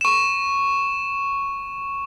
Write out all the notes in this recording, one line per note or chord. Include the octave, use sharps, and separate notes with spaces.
C#6 E7